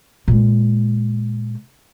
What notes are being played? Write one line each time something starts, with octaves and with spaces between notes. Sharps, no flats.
A#2 G#3